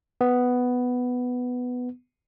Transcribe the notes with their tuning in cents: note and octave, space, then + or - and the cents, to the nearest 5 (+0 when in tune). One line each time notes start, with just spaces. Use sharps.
B3 +5